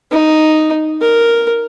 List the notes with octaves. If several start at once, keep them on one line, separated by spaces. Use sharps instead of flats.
D#4
A#4